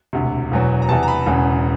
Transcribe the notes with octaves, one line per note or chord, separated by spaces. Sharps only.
E1 D2 C3
E1 E2 B2 F#3
A#5
E2 C3 E3 A5
A#5
B5
E1 E2 C#3 E3